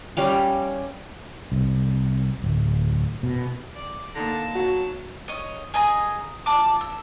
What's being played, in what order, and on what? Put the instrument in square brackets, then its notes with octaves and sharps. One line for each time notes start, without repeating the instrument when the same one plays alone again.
[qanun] G3 C#4 F5
[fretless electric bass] C2
D1
B2
[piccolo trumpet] D5
[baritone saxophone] D3 [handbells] A#3 D#4 A#6 [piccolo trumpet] A5
[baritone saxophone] F#3 [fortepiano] F#4
[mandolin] C#5 D#5
G#4 D#5 G#5 A#5
F4 A5 D6
E6